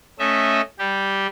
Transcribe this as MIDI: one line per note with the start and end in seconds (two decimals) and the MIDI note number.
0.19 0.61 57
0.19 0.61 61
0.19 0.61 75
0.19 0.61 76
0.79 1.27 55
0.79 1.27 67